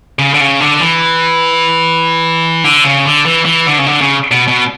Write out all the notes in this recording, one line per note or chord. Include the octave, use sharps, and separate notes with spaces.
C#3
D3
C#3
D3
E3
D3
C#3
D3
E3
E3
D3
C#3
D3
C#3
B2
B2